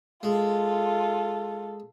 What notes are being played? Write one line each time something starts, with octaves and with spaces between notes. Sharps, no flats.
G#3 F4 A4